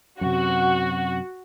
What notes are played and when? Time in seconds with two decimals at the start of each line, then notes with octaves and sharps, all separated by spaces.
0.21 F#2 C3 F#4